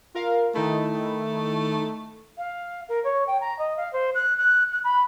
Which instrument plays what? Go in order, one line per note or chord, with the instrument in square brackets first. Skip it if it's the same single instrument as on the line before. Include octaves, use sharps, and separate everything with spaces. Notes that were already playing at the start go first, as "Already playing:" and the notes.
[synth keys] F4 A#4 F5
[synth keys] D#3 D#4 E4 [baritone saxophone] A3
[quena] F5
A#4
C#5
G5
A#5
D#5
F5
C5
F#6
F#6
F#6
B5